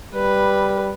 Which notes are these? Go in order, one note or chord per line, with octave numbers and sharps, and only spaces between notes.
G3 B4